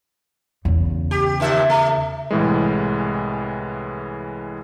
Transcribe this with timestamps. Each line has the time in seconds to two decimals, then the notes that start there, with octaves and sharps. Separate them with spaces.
0.65 E2 C#3
1.11 G4
1.40 D#2 A#2 E5
1.70 A3
2.31 C2 A2 E3 G#3